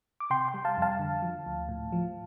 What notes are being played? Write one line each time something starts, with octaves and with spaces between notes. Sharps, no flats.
D6
C3 G5 C6
G5 C6
G3
F5 A5
F2 F5 A5
D3
F3
D2
A2
F3